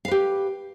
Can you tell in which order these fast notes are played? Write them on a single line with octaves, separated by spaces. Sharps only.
F5 B4 G4